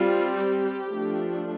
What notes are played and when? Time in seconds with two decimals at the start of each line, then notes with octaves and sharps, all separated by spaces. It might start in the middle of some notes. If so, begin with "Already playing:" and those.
Already playing: G3 C4 F4
0.37 G4
0.89 F3 A3 D4